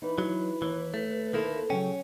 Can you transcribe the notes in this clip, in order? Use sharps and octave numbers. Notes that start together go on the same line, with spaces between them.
E3 D#4 B4
F#3
D#2 E3
A3
D2 D#3 A#3 E4 A4 C5
C#3 F#3 C#4 G5